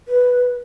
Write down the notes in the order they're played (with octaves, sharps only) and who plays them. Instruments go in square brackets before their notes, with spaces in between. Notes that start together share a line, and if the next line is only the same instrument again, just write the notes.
[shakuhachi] B4